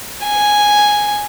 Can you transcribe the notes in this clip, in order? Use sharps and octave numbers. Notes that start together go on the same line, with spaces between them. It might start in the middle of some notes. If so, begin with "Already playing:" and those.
G#5